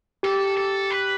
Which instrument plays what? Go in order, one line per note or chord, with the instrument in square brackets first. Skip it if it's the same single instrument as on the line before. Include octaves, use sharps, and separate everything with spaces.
[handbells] G4 [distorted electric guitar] A4
[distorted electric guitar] A4
B4